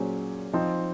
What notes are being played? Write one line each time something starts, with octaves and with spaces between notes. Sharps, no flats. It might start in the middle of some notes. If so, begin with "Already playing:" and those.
Already playing: A#2 F#3 C#4 G#4 C5
F3 C4 D#4